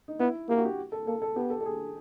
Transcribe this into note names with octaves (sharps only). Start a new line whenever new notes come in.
D#4
B3 E4
A#3 G4
F#4
G4
A4
A#3 A4
A4
B3 G4
A4
A4
G#4